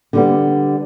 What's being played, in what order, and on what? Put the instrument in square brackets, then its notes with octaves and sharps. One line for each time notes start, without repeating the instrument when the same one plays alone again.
[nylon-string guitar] D3 G3 B3